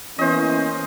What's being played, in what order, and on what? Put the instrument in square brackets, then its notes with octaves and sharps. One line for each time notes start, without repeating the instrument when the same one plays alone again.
[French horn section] E3 A#3 B3 [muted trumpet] C#4 [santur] C5 D#5